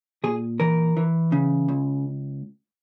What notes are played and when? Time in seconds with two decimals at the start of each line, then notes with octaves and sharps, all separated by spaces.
0.24 A#2 G#4
0.60 E3 A#4
0.97 E3
1.32 C#3
1.68 C#2